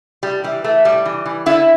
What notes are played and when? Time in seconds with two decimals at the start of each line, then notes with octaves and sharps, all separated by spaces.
0.23 A2 G3
0.44 E3 G3
0.64 E3 A3
0.85 A2 G3
1.06 E3
1.25 E3
1.46 D3 E4